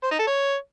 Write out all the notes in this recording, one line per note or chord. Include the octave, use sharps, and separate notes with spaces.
C5
D#4
A4
C#5